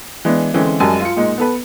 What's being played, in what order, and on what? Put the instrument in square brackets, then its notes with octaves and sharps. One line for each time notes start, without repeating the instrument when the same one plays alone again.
[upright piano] E3 G#3 B3 D4
D3 E3 G#3 C4 C#4
F#2 G3 G#3 G#5 A5
F4 C#7
A#2 G#3 D#4
B3 A4 B4